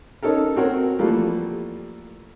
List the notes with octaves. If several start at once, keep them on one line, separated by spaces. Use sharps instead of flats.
C#4 D#4 A4 A#4
C4 F#4 A#4 C#5
E3 F3 G3 A3 A#3